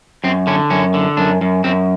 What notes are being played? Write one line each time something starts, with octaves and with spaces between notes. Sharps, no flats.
F#2 C4
D3 C#4
F#2 C#4
D3
F#2 D4
F#2
F#2 C4